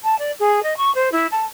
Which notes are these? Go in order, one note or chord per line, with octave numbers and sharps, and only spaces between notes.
A5
D5
G#4
D#5
C#6
C5
E4
A5